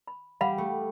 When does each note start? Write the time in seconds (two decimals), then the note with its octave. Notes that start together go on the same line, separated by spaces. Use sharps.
0.08 B5
0.41 G3 F5 F#5 B5
0.58 A3